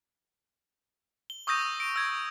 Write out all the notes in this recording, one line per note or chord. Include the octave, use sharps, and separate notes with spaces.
G7
C#6 D#6 E6 G6 A#6 D#7
D7
E6 G#6